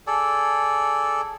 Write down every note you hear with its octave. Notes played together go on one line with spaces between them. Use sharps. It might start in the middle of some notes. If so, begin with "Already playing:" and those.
G#4 A4 D5